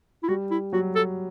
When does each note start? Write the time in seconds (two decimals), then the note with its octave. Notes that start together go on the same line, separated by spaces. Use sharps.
0.23 E4
0.28 G3 F#4
0.51 E4
0.72 F#3 F#4
0.95 A4